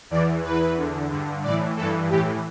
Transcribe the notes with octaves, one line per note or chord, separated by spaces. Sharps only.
E2 E3 D5
E2 E3 B4
E2 D3
G2 D3
A2 E3 D5
G2 E3 A4
A2 E3 G4